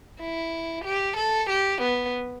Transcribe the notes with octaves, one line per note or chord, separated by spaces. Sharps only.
E4
G4
A4
G4
B3